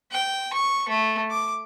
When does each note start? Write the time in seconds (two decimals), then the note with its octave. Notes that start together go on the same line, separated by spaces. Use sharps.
0.12 G5
0.53 C#6
0.89 A3
1.30 D6